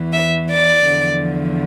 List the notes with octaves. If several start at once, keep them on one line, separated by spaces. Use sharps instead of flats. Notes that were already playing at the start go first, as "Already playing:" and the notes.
Already playing: E2 E3
E5
D5
E2 D3 F3